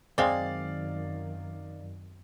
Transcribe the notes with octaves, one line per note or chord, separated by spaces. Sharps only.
F#2 D#3 G#3 C4 D5 F5